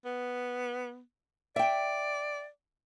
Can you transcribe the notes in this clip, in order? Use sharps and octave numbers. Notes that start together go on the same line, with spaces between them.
B3
D5 E5 G5